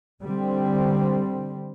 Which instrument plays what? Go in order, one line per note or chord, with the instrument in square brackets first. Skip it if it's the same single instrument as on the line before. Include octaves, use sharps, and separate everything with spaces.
[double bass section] D3 G3 C4